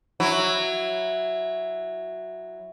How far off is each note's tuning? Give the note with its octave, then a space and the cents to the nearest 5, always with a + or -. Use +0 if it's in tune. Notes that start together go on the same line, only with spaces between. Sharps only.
F#3 +0 E4 +0